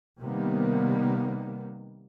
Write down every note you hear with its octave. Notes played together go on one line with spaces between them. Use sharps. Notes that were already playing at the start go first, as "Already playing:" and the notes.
C3 D#3 G3 A#3 B3